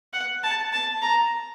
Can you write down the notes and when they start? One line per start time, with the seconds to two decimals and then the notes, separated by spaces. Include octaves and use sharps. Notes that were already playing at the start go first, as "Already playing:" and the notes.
0.13 F#5
0.43 A5
0.73 A5
1.02 A#5